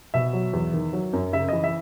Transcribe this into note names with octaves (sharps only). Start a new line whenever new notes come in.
B2 E5
F#3
E2
D#3
F#3
F#2
C#3 E5
E3 D#5
E5